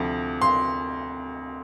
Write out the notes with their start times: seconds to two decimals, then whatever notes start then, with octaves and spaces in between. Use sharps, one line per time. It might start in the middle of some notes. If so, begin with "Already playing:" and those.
Already playing: D2 C3 F3
0.41 C6